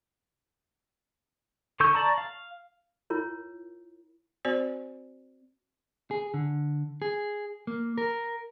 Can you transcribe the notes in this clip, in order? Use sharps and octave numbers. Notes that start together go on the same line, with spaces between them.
D3 A4 C#6 E6 G6
D5 A5 A#5 C#6
F5
E4 F4 A#4 C#5
C4 F#4 C5 D5
G#4
D3
G#4
A#3
A#4